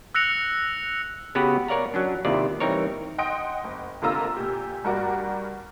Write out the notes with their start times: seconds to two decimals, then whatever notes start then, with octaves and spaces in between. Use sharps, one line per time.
0.15 E6 F#6 A#6 C#7 F7
1.35 C#3 B3 F#4 G4 B4
1.68 A#4 C#5 D5 F5 A#5
1.94 F#3 C#4 D4
2.25 D#2 C3 D#3 E4 F4 D5
2.60 E3 G3 C4 D#4 A#4 C#5
3.18 D#5 F#5 G5 C6 D#6 D7
3.64 F#1
4.02 G#1 D3 A#3 F4 A#5 E6
4.37 A#2 G4
4.85 G2 F#4 A#4 D5